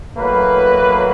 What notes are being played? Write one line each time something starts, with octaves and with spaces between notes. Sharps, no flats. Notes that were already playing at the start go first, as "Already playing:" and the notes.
A2 F#3 A#3 B4